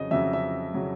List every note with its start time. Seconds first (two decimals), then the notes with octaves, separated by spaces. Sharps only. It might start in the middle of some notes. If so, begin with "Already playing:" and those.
Already playing: F2 C#3 F#3 D#5
0.11 F2 C#3 F#3 E5
0.33 E5
0.74 C#3 F#3